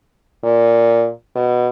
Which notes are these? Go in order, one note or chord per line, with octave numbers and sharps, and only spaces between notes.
A#2
B2